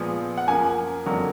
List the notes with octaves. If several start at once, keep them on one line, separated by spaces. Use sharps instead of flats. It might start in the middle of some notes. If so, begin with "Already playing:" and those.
Already playing: A#2 F3 G#3 B3
F#5
F#2 F3 A#3 G#5
F2 D3 F#3 A#3